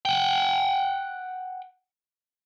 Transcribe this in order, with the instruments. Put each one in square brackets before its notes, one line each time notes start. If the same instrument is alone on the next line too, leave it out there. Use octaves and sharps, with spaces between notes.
[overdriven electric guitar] F#5 G5